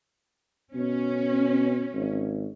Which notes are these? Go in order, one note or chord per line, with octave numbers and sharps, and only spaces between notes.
B2 C#4
G#1